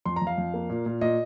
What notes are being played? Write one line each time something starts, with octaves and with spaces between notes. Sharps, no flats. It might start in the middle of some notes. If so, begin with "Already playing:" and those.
F2 C6
A#5
F2
F5
F2
A#3
A#2
A#2
A#2 D#5